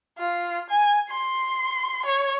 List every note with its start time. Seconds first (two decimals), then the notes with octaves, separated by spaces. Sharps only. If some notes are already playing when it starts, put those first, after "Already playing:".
0.19 F4
0.70 G#5
1.09 C6
2.05 C#5